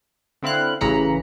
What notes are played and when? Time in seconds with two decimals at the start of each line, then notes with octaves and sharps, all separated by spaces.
0.42 D3 C4 E4 F5 F#6
0.81 A1 C#3 E3 A#5 B5 C#7